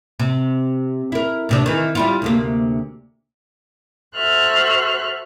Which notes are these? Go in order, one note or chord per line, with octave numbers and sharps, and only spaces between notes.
C3
E4 A#4
D2 C3 D4
D#3 E3
G3 E4 F4
D2 C3 A#3
F#4 A4 C5 E5 F6 F#6